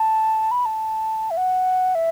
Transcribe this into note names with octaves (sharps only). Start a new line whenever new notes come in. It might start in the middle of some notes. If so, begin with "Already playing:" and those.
Already playing: A5
B5
A5
E5
F#5
E5